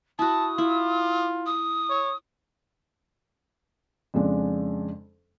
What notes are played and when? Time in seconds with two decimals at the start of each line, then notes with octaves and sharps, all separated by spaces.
0.19 E4 F#4 A5 D#6
0.58 E4 F4
1.46 D#6
1.90 C#5
4.14 F2 C#3 G#3 D4